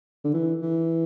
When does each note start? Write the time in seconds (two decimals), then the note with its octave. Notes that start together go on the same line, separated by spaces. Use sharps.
0.25 D3
0.34 E3
0.62 E3